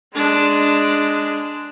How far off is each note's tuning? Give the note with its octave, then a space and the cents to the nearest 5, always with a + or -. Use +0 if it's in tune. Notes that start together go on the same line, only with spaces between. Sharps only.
G#3 +0 D4 +0